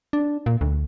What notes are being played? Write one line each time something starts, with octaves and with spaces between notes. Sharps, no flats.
D4
A#2
D2